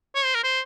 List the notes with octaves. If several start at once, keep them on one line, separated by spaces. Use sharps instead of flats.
C#5
C5
A#4
C5